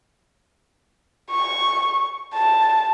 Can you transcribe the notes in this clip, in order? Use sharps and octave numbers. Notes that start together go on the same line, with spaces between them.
C#6
A5